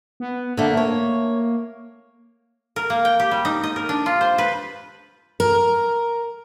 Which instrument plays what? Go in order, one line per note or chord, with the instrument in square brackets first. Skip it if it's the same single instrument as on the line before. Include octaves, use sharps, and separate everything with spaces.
[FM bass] B3
[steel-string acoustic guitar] D3 A3 [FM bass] A#3
[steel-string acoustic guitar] C#5
[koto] A#4
A#3
G5
G4
G3
D#4
D#5
A#4
D4
F4
C5
B4
[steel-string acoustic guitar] A#4